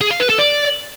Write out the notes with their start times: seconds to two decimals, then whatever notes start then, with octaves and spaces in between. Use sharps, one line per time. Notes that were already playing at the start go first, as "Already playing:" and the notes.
0.01 G#4
0.11 F5
0.20 B4
0.29 A4
0.39 D5